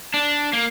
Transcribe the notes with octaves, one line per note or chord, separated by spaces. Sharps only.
D4
A#3